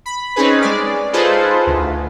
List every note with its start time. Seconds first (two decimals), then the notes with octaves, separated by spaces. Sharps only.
0.06 B5
0.36 C4 C#4 D#4 G#4 B4
0.62 G#3 D5
1.13 D#4 F4 G#4 A4 B4 C5
1.67 D2